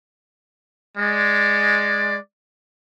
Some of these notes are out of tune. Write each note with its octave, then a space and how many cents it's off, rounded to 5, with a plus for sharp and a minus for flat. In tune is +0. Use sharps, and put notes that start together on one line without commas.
G#3 +0 D5 +10